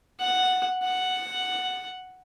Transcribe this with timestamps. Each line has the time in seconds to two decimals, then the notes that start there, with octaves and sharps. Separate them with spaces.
0.20 F#5
0.83 F#5